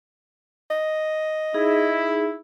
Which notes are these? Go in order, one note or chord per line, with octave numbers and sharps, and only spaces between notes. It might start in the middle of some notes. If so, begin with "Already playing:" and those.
D#5
D#4 E4 G#4